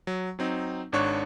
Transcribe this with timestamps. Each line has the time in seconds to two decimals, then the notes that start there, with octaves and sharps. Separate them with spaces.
0.07 F#3
0.39 F#3 C4 D#4
0.92 G#1 G#2 D4 C#5 C#6 F#6